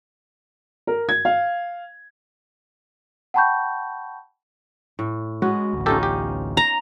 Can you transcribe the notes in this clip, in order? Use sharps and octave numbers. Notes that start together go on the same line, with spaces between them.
A#4
G#6
F5
F#5 G5 A5 B5 C#6 G6
A2
G#3 B3 C#4 F#4
A1 D2
C#4 D#4 F4 G4 A4
G4
A#5